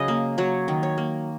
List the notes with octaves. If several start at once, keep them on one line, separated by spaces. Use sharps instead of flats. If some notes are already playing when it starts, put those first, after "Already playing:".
Already playing: C#3 F#3 D#5
A#3
F#3 C#5
D#3
C#5
A#3